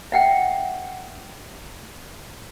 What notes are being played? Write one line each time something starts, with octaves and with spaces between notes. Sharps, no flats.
E5 F#5 G5